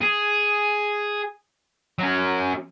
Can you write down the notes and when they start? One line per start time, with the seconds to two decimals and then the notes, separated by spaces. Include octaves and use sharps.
0.01 G#4
1.99 F#3 C#4